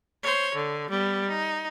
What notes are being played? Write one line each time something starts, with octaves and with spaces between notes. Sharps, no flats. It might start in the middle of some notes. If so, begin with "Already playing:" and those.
C5 C#5
D3
G3 B3
D#4